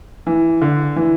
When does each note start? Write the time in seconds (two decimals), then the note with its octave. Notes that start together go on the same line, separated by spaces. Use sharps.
0.27 E3
0.61 D3
0.96 E3